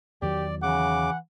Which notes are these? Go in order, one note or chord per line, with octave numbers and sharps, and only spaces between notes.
E2 D#3 F#3 G4 D5
C#3 E3 F#5 D6